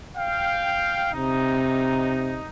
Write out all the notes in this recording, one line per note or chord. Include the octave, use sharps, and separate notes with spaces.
F5 G5
C3 D#4